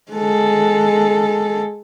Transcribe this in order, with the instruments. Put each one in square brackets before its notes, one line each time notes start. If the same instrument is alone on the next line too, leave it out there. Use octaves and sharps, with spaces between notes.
[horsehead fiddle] G#3 A4